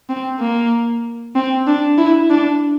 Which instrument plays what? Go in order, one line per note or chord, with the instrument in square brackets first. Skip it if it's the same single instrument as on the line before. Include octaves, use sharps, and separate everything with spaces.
[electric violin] C4
A#3
C4
D4
E4
D4